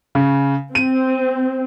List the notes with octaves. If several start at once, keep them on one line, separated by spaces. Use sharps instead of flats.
C#3
C4 D#7